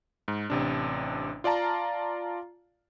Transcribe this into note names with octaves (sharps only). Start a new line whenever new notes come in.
G#2
A1 C3 D4
F4 D5 F5 A5 A#5